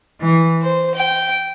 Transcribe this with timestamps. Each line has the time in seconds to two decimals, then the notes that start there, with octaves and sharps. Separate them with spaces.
0.21 E3
0.61 C5
0.94 G5